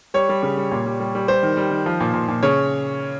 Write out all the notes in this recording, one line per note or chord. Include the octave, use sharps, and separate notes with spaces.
G3 C#5
G3
C#3
G3
A#2
G3
G3
G3
G3 C5
D#3
G3
D#3
F3
A#2
A#2
A#2
C#3 C#5